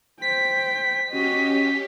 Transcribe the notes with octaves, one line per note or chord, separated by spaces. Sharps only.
C5 G5 B6
C#4 F#4 G4 D#5